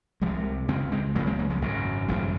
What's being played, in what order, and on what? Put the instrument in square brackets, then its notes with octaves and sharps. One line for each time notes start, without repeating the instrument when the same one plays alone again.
[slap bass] C2 C3 F3 G#3
C#2 C#3 G#3 C4
G#3 C4
C#2 F#3 A#3
C#3
G#3 C4
F#3 A#3
F3 G#3
G#1 F#2 C#3
G#1 F#2 C#3 F3 G#3